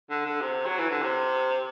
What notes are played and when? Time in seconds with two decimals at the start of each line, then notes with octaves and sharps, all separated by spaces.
0.11 D3
0.26 D3
0.41 C3
0.66 F#3
0.78 E3
0.91 D3
1.03 C3